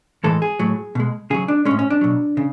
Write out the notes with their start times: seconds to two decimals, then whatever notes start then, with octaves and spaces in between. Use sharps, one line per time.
0.24 A2 E3 G#3 A4
0.42 G#4
0.59 A2 F#3
0.95 B2 G#3
1.30 C#3 F#3 G#4
1.48 D4
1.65 G#3 C#4
1.71 A2
1.79 C#4
1.90 D4
2.01 B2 F#3
2.37 C#3